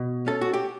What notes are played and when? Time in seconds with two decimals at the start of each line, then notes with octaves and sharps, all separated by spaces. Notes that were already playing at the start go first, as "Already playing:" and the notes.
Already playing: B2
0.27 C#4 A4
0.41 F#4
0.54 G4